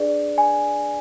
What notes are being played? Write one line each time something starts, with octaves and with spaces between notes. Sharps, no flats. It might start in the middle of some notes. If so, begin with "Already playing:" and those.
Already playing: D4 G#4 B4 D5
G#5